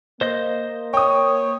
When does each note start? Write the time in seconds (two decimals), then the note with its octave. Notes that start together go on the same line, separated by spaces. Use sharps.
0.21 A#3 C5 D#5 G6
0.94 C#5 G5 D#6